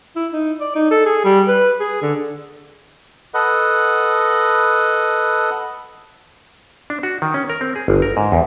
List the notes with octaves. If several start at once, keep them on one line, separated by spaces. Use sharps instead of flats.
E4
D#4
D5
D#4
A4
G#4
G3
B4
G#4
D3
A4 B4 D#5 F#5
D4
F#4
D#3
C#4
A#4
C4
G#4
G1
A#4
G#2
E2